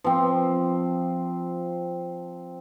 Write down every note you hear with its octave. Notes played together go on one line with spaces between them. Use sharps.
F3 C4